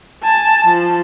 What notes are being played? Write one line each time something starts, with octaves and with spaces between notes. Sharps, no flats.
G#5 A5
F3